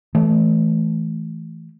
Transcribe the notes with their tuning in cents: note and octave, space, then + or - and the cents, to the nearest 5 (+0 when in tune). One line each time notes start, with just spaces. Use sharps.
E3 -10 A3 -15